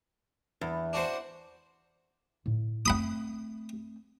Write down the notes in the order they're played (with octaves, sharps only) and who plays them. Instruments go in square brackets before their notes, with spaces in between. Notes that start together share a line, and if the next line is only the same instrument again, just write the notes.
[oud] E2
[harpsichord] D4 F#4 C5
[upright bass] A2
[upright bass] A3 C4 [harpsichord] F#5 B5 D#6